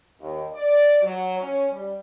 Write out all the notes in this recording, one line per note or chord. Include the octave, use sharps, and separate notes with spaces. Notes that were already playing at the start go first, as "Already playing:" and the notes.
D#2
D5
F#3
C#4
G3